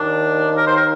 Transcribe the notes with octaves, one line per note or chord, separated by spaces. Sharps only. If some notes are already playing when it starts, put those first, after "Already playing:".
Already playing: D#2 D#3 D4
A#4
C5
A#4